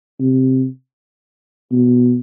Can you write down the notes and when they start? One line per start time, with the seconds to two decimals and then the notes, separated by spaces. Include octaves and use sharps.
0.20 C3
1.72 B2